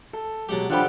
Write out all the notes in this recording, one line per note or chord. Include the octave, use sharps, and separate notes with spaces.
A4
B2 F#3 G#3 G4 F#5 A5
D3 F3 D4 F4 G4 F#5 G5 B5